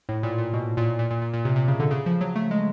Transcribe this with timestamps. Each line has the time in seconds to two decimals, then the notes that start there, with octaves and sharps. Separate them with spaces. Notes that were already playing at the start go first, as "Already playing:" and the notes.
0.09 A2
0.23 A#2
0.38 A#2
0.53 B2
0.77 A#2
0.99 A#2
1.11 A#2
1.22 A#2
1.34 A#2
1.45 C3
1.56 C3
1.68 C#3
1.80 D3
1.91 C#3
2.06 F3
2.21 F#3
2.36 A3
2.51 G#3